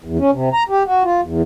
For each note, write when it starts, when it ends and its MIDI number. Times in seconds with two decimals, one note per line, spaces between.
0.04 0.18 40
0.19 0.31 61
0.33 0.49 48
0.53 0.63 82
0.69 0.83 67
0.86 1.03 66
1.04 1.21 65
1.22 1.42 40